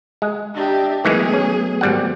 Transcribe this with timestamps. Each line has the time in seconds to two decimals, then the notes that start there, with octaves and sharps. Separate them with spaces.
0.22 G#3
0.55 D4 G4 D#5 E5 A#5
1.05 D#3 E3 F#3 G#3 A3 B3 G#4
1.33 C#4
1.81 G#1 G3 F#5